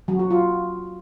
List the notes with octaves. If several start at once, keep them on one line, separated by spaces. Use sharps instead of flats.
F#3
F#4
F4